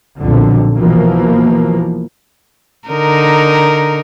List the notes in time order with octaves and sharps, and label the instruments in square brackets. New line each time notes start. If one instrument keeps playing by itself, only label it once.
[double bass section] B1 F2 A#2 D3 F3
B2 E3 F3 A#3
[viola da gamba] D3 D#4 A#4